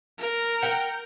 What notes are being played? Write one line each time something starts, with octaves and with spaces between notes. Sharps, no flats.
A#4
F#5 G5 A#5 G6